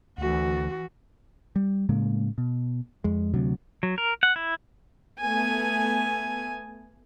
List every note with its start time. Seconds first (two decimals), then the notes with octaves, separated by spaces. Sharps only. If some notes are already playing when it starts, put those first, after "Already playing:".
0.18 D2 E3 F#4
1.56 G3
1.89 A2 C#3 G#3 A#3
2.38 B2
3.04 F2 G#3
3.34 D2 C3 F#3
3.83 F#3
3.98 A#4
4.23 F#5
4.36 E4
5.19 A3 B3 G#5